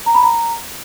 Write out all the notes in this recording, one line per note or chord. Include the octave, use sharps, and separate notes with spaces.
A#5
B5
A#5